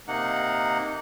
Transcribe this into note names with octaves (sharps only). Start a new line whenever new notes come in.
C3 A#3 D#4 F#5